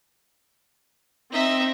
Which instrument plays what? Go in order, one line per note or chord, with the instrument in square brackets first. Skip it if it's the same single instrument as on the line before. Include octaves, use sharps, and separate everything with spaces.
[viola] C4 [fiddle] D#4 E5